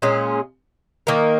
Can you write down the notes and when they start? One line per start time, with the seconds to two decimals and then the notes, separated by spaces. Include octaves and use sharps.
0.02 A#2 G#3 C#4 G#4
1.07 D#3 A#3 D#4 A#4